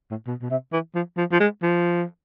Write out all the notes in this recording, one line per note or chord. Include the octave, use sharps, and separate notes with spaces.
A2
B2
B2
C3
E3
F3
F3
F3
G#3
F3